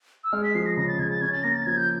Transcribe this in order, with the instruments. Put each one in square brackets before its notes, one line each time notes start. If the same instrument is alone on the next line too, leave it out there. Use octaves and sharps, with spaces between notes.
[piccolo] E6
[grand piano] G#3 [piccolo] F6
[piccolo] B6
[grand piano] F3 [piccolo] C7
[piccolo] A#6
[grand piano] C#3 [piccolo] A#6
[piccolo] A6
[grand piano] C#3 [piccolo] G#6
[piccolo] A6
[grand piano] C#4 [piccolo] G#6
[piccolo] A6
[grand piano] A#3 [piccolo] A#6
[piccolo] A6
[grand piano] F3 [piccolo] G#6
[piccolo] G6